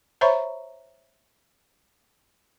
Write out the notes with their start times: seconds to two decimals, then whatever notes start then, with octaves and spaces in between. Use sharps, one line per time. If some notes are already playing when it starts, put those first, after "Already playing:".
0.21 C5 C#5 E5 A#5 B5 C#6